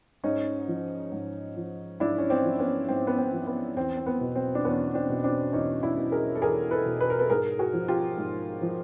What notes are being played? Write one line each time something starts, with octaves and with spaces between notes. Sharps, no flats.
G#2 C#4 D#4
F3
G#2
F3
G#2 D4 E4
C#4
C4 D4
F3
B3 C#4
G#2 C4
B3
C4
F3
B3
E2 C4
C4
B3
B2
C4
D4
E2 B3 C#4
C4 D4
B2
C4 D4
E2 C#4 D#4
D4 E4
B2
G#4 A#4
A4
E2 G#4 A#4
A4 B4
B2
B4
A#4
A4 B4
G#2 G#4 A#4
F#4 G#4
F3
F4 G4
G#2
F3